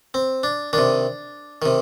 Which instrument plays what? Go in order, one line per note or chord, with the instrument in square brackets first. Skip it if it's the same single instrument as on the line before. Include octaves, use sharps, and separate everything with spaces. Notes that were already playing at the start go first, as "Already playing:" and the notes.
[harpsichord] C4
D4
D#3 D4
C3
C3 D#3